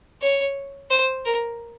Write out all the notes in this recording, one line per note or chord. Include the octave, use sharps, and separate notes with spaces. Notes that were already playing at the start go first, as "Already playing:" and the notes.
C#5
C5
A#4